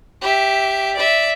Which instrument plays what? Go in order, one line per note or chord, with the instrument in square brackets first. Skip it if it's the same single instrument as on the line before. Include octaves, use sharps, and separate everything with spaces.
[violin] G4 E5
D5 E5